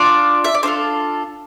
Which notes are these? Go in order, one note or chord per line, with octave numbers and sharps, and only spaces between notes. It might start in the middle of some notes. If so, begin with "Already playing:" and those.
Already playing: D4 F4 D5
E5
D5
D4 F4 A4 C5